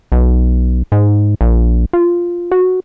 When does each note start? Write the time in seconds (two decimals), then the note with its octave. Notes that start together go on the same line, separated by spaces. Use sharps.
0.12 B1
0.92 G#2
1.41 A#1
1.93 F4
2.52 F#4